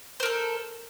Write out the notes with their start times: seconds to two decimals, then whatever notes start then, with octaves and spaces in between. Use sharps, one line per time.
0.20 C5
0.23 A#4
0.26 A4